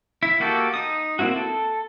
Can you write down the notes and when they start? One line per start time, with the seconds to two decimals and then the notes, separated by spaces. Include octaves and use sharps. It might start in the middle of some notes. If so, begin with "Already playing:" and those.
0.23 E4
0.40 A#3 F#4 G4 A4
0.74 D#4 D#6
1.19 A#3 C4 E4 F#4
1.36 A4